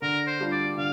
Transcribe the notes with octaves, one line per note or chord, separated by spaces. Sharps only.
D3 A#4
C5
G3 D4 F4
D5
D3 F5